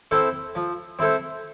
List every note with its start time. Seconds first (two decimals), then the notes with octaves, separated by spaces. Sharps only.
0.11 C4 E4 A4 C5
0.55 F3
0.99 C4 E4 A4 C5